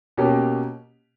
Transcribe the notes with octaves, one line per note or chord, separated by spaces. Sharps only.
B2 A#3 C#4 G4